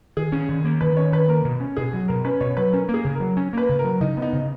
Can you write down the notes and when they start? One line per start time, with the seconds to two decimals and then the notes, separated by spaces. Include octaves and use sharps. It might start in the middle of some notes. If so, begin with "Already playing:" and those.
0.17 D#3 G#4
0.32 C#4
0.49 D#3
0.64 A#3
0.81 D#3 B4
0.97 C#4 C#5
1.12 D#3 B4
1.28 A#3 A#4
1.45 B2
1.60 C#4
1.77 B2 G#4
1.93 F#3
2.08 B2 A#4
2.25 C#4 B4
2.40 B2 C#5
2.57 F#3 B4
2.72 C#4 A#4
2.89 A#3
2.94 G#4
3.05 C#3
3.15 A#4
3.20 F#3
3.37 C#4
3.53 A#3 B4
3.69 C#3
3.79 A#4
3.84 F#3
4.00 C#3 D#4
4.17 B3
4.22 D#4
4.33 C#3